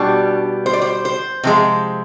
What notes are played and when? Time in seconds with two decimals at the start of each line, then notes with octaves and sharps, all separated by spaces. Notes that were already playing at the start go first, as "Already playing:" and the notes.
Already playing: B2 G3 D4
0.66 C5
0.73 D5
0.82 C5
1.05 C5
1.43 C3 F3 G#3